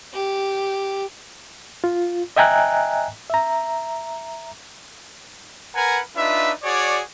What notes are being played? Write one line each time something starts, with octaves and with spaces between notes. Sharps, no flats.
G4
F4
D#5 E5 G5 G#5 A#5 F#6
E5 A#5
A#4 B4 F#5 G#5 A#5
D4 D#4 F4 B4 E5
F#4 G#4 C#5 D5